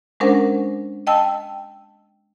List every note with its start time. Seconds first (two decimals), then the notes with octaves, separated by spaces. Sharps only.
0.20 G#3 C#4 D4 A#4 C5 F#5
1.07 D#5 G5 A5 E6